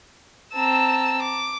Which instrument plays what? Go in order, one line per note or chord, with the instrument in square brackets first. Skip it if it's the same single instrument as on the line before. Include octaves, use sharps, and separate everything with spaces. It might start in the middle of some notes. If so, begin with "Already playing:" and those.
[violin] C4 E6 [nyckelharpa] A5 A#5
[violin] D6